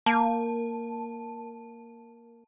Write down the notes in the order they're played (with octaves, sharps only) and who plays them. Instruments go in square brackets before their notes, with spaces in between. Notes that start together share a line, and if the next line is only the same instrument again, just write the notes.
[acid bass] A#3 [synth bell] A5